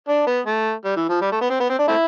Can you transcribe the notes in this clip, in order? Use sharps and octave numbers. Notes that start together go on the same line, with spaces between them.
D4
B3
A3
G3
E3
F3
G3
A3
B3
C4
B3
C4
D4
A3 C4 E4